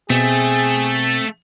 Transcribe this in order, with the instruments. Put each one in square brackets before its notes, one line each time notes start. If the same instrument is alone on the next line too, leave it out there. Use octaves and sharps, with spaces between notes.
[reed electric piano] B2 [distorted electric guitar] A3 [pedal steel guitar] C4 [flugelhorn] G#4